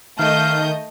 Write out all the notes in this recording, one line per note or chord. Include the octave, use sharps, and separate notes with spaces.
D#3 A3 D#5 F5 G6